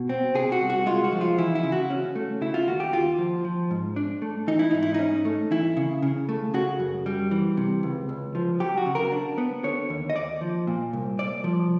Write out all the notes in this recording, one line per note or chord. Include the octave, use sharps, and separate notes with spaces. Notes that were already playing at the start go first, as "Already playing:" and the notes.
Already playing: B2
C4
C3 G#4
F#4
C2
F#4
G#3 F4
F#4
F3
F4
E3 E4
E4
C#3
F#4
C#4
A3
C#3 E4
F4
D#2 F#4
G4
D#2 F4
F3
F3
G#2
D4
A3
E3 D#4
E4
G#2 D#4
E4
C#4 D#4
A3
E3 E4
C#3
C#3
A3
C#3 F#4
F#2
G3
E3
C3
C#2
C#2
F3
F#3 G4
F#4
C#3
A#4
D4
B3
D3 C#5
D#2
D#5
D#2 D5
F3
A#2
C2
C2 D5
F3